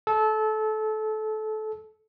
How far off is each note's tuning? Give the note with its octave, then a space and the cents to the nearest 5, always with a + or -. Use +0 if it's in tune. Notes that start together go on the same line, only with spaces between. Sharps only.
A4 -25